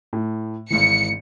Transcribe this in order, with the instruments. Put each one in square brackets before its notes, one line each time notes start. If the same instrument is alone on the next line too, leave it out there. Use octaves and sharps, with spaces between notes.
[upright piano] A2
[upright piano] G#1 G#2 E3 [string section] C#7